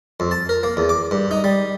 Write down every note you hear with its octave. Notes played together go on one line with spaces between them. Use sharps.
F2
A5
A#4
A#3
E2
D6
G2
D#4
G3